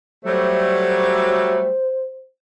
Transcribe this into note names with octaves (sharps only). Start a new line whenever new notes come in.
F#3 G3 A3 C5